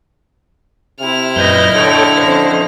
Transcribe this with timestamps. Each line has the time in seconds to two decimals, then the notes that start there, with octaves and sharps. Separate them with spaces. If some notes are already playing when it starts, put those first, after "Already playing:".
1.00 C3 E4 F6
1.36 F#2 A#2 B4 D#5 G6
1.75 D3 A4 C#5 G5
2.18 F2 C#4 C5 D#5